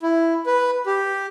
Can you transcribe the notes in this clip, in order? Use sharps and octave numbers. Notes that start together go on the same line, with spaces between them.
E4
B4
G4